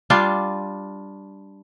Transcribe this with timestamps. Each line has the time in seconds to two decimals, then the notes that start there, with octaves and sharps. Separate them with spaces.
0.10 G3 D4 F4